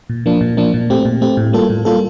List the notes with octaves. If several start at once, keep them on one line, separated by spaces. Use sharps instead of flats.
A#2
F3 A#3 D4
A#2
F3 A#3 D4
A#2
A3 C4 G4
A#2
A3 C4 G4
A2
G3 A#3 F4 A4
A2
G3 A#3 F4 A4